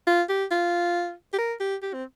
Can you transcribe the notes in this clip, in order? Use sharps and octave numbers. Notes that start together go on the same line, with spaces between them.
F4
G4
F4
G4
A#4
G4
G4
C4